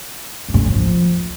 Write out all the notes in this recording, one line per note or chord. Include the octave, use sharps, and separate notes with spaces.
G2
G#2
A2
G2
F3